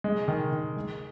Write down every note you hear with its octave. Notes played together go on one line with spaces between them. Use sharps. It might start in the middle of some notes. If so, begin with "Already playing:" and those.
G#3
D#3
D#3
G#3